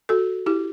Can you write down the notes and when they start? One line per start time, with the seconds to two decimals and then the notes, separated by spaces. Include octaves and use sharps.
0.09 F#4 A4
0.46 E4 G4